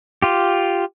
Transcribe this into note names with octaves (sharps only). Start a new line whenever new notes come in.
F4 G4